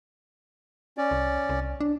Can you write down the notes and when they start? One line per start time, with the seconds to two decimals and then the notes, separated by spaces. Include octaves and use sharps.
0.98 C#4 D5
1.11 C2
1.49 C2
1.81 D4